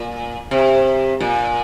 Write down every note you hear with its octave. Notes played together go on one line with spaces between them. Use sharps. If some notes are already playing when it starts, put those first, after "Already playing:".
Already playing: A#2
C3
A#2